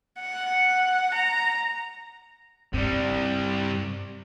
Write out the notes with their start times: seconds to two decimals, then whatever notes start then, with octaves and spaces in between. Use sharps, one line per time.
0.20 F#5
1.14 A#5
2.73 G2 C3 G3